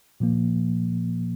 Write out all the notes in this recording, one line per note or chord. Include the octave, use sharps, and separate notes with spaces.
A#2 F3 A#3